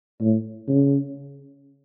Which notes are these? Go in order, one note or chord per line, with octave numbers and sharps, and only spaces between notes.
A2
C#3